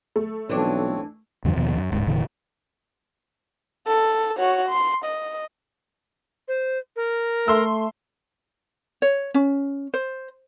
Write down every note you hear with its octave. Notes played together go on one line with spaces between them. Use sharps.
A3
B1 E3 F3 C4 D4 C#5
E2 G2 D3 F3
D#2 B2 F3
F#2
D1 G#2
F1 A#2 D3 E3
A4
F#4 C#5
C6
D#5
C5
A#4
A3 C6 E6
C#5
C#4
C5